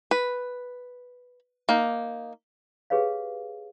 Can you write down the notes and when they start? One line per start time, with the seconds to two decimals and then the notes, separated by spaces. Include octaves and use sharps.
0.11 B4
1.69 A#3 D#4
2.90 G4 G#4 B4 C#5 F5